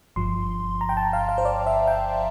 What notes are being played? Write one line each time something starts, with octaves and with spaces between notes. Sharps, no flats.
G1 G2 F3 C6
A#5
G5
A5
F5
F5
C5
D5
E5
G5